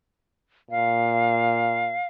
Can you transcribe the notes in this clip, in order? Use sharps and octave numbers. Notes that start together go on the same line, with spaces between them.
A#2 F5